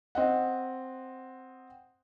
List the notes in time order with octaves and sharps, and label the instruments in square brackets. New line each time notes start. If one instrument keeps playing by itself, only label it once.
[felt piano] C4 D#5 F#5